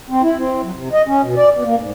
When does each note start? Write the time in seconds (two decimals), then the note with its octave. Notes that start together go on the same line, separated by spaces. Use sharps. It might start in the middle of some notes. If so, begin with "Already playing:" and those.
0.10 C4
0.23 E4
0.38 C4
0.63 F#3
0.75 C3
0.93 D#5
1.07 C#4
1.22 B2
1.37 D5
1.53 B2
1.66 A#3
1.79 G#2